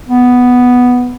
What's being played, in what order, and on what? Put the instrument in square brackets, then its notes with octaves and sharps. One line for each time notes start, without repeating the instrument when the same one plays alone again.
[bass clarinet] B3